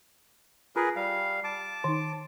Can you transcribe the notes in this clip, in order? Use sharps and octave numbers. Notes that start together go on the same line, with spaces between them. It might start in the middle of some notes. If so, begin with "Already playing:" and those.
F4 G#4 A#4 B4
G3 F5
A5 D6
D#3 D#4